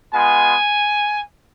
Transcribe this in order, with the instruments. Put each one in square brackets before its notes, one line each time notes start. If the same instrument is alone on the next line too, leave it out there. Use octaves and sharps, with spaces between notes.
[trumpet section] G#3 B3 F4 G#5